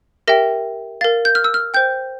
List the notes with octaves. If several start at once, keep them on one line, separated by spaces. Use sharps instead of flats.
G4 A#4 E5 G5 A#6
A#4 F5 A6
G6
F6
E6
F6
C5 G5 G6